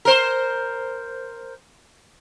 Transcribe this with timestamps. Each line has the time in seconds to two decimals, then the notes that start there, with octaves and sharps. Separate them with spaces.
0.05 A#4 C5